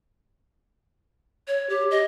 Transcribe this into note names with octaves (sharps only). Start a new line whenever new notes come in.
C#5
G4
D#5